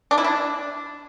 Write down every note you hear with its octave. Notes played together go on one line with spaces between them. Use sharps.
D4
E4
D4